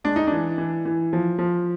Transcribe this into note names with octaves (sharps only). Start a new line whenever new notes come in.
G#3 D4
D#4
E3 D4
E3
E3
F3
F3